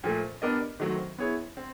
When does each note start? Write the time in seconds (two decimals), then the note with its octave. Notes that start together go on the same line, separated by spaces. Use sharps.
0.04 A#2 F3 A3
0.42 B3 D4 G4 A#4 D#5
0.80 D#3 F#3 A3 C4
1.18 B3 E4 G#4 C#5
1.57 C4